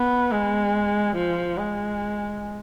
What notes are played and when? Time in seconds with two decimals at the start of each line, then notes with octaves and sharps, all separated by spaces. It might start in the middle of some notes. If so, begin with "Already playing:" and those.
Already playing: B3
0.31 G#3
1.16 F3
1.57 G#3